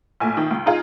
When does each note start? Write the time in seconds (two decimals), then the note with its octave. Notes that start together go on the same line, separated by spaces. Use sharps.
0.20 A#1 A2 G#5
0.37 D#3
0.51 C#2
0.66 D#4 F4 G#4